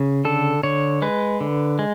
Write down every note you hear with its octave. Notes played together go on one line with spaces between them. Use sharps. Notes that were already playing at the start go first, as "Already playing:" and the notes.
Already playing: C#3
D3 A4
D3 C#5
G#3 B4
D3
G#3